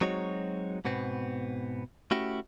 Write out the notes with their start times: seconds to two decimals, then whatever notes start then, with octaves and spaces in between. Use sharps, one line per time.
0.01 F#3 G#3 C4 D#4 F#4 C#5
0.85 G#2 B2 B3 C4
2.11 A3 C#4 E4 F#4 G4